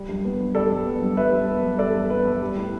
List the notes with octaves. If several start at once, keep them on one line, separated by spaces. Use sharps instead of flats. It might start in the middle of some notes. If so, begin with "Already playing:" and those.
Already playing: G3
G2
B3
G2
G3 A4 D5
G2
B3
G2
G3 B4 E5
G2
B3
G2
G3 A4 D5
G2
B3 B4
G2
G3
A2